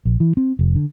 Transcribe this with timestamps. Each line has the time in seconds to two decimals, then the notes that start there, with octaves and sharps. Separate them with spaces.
0.05 A#1
0.20 E3
0.37 C4
0.59 F1
0.75 D3